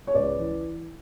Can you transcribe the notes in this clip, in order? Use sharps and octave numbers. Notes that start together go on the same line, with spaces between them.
C#5
C#2 B4 D5
E3